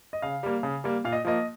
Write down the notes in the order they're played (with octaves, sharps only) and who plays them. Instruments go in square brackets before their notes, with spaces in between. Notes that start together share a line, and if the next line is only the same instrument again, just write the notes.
[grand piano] D#5
C#3 F5
G3 A#3
C#3
G3 A#3
A#2 F5
D#5
F3 A#3 D#5